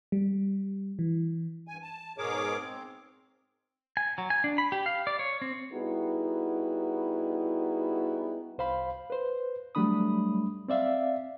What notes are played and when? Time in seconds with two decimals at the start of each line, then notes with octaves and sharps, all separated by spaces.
0.12 G3
0.99 E3
1.67 G2 G#5
1.82 A5
2.18 G#2 B2 G#4 A#4 C#5 D6
2.58 C4
3.97 G#5
4.18 F#3
4.30 G#5
4.44 D4
4.58 B5
4.72 G4
4.86 F5
5.07 D5
5.19 C#5
5.42 C4
5.72 G3 B3 D#4 E4 F#4 G#4
8.58 C2 C5 F5 B5
9.10 B4 C5
9.75 F#3 G3 A3 D4 B5 D#6
10.68 C4 D5 E5 F5